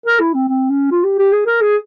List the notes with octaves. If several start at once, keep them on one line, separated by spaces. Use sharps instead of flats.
A#4
E4
C4
C4
C#4
F4
G4
G4
G#4
A#4
G#4